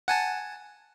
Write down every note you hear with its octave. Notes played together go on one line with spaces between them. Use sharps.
F#5 G#5 A5